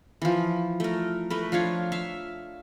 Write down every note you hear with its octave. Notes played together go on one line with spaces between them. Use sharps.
E3 F3
A3 A#4
A3 A#4 B4
F3 D4 C#5 F5
E5 F5